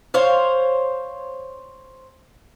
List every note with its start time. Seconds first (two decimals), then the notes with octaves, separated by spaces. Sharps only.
0.14 C5 C#5 F5